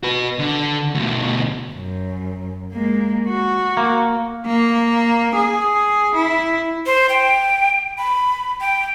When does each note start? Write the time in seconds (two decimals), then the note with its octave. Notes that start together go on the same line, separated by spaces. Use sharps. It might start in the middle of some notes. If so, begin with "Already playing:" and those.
0.03 F#4 B4
0.39 D3
0.95 D2 B2
1.74 F#2
2.73 G#3 A#3
3.28 F#4
3.77 A#3
4.46 A#3
5.36 G#4
6.15 E4
6.86 C5
7.09 G5
7.98 B5
8.61 G5